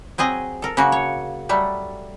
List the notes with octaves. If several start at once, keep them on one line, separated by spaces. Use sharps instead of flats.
F#3 C4 G#4 D#5
A4 A#4
C#3 F#3 A#3 F#4
C#5
F#3 G3 A3